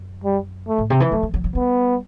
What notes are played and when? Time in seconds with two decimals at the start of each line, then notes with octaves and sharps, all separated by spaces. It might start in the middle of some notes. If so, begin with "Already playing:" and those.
Already playing: F#2
0.24 G3
0.68 A3
0.78 A2
0.90 C3
1.00 E3
1.11 F#3 A3
1.23 F#3
1.34 F#3
1.44 F#3
1.55 G3 B3